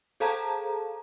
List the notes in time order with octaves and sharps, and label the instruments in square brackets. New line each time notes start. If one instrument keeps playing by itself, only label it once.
[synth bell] G#4 A4 C5 F5 A5 A#5